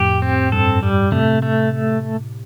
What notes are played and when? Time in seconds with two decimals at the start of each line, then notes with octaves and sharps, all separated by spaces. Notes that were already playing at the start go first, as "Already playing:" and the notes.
Already playing: F2 A2 G4
0.22 C4
0.52 G2 A4
0.83 G3
1.12 A2 C3 A3
1.42 A3